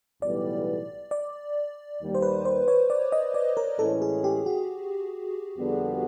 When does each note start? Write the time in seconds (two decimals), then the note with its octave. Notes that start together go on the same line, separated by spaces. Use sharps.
0.22 B1 A2 E3 G3 B3 D5
1.11 D5
2.00 D#2 D#3 G3 A#3
2.15 C5
2.22 B4
2.45 C5
2.68 C#5
2.90 D5
3.12 D#5
3.34 D5
3.57 A#4
3.79 A2 E3 G#3 C#4 A4
4.02 G#4
4.24 G4
4.46 F#4
5.58 F2 D3 G3 B3